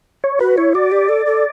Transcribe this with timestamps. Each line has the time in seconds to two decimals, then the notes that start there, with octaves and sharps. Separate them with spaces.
0.24 C#5
0.40 F#4 B4
0.58 E4 C#5
0.74 F#4 D5
0.92 G4
1.09 A4
1.26 A4